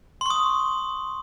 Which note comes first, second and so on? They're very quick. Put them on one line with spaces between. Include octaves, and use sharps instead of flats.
C6 C#6 D#6